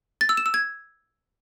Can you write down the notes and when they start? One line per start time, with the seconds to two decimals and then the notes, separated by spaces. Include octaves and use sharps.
0.21 A6
0.29 E6
0.37 E7
0.46 E6
0.54 G#6